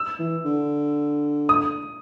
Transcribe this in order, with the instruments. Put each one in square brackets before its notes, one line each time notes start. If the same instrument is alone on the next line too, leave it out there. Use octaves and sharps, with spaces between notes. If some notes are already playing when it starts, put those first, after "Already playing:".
Already playing: [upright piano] E6
[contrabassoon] E3
D3
[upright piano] D#6